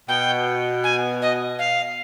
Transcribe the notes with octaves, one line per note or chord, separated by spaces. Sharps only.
B2 G5
G#5
D#5
F5